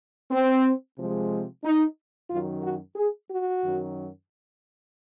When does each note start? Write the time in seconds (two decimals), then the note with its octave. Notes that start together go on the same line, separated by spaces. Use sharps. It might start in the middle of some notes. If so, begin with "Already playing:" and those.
0.31 C4
0.97 C3 F3 G#3
1.64 D#4
2.30 F#2 D#3 F#3 F4
2.63 F#4
2.96 G#4
3.29 F#4
3.62 F#2 D#3 F#3